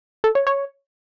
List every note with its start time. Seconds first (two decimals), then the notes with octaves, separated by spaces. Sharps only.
0.24 A4
0.35 C#5
0.47 C#5